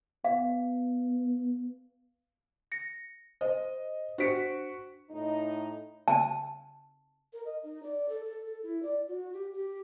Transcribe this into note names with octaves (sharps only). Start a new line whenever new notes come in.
B3 F5
A#6 C#7
C5 D#5
D4 F#4 C5 B6 C#7 D7
A2 D#4
A5
A#4
D#5
D#4
D5
A4
A4
A4
E4
D5
F#4
G4
G4